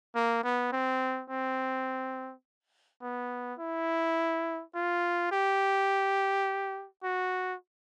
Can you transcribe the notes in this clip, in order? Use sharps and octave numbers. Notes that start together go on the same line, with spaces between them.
A#3
B3
C4
C4
B3
E4
F4
G4
F#4